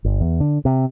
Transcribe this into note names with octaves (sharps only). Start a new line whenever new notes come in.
G1
E2
D3
C3